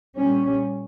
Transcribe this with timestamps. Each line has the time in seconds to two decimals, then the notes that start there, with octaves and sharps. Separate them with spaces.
0.16 A#2 G3 C#4